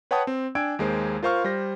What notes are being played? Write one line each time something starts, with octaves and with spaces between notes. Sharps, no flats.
B4 C#5 F#5 G5 A5 D#6
C4
D4 G5 G#5 E6 G#6 D7
D#2 G#3 A#3 C5
F4 A#4 C5 F5 C#6 F6
G3 C5 A#6